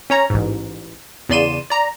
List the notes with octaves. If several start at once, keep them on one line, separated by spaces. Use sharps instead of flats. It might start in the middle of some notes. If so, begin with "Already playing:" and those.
C#4 C#5 A#5
A1 G#2
E2 C#3 D5 C6 D#7 E7
D5 A#5